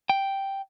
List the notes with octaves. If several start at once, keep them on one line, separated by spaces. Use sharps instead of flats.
G5